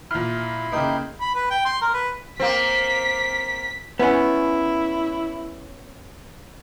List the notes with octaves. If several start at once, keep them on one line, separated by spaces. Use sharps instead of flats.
A#2 E4 B5 C6 F6
C#3 A#3 D#4 G4
B5
B4
G5
C6
A#4
B4
A#3 C4 B6
B3 C#4 E4